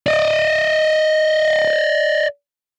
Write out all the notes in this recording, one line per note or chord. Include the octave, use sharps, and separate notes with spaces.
D5 D#5